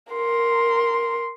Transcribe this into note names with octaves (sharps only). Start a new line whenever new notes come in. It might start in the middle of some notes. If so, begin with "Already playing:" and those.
A#4 C6